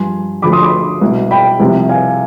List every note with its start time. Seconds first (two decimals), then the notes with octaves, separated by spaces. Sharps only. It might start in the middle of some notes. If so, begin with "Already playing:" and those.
Already playing: G2 F3 G#5 C6
0.42 D2 D3 F3 B5 D6
0.52 C6 D#6
0.62 B5 D6
1.01 C2 B2
1.31 G5 B5
1.60 C2 C3 F3
1.89 F5 G#5